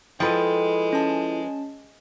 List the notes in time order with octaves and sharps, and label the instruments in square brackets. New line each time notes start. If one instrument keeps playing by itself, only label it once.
[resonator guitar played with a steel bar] F3 B4 [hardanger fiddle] G#3 [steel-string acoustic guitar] E4 A4 D#5 [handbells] G5
[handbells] C#4 A5